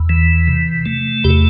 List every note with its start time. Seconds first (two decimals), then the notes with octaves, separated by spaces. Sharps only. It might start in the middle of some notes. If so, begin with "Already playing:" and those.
Already playing: E2
0.09 E3
0.48 C3
0.86 A3
1.24 E2 G4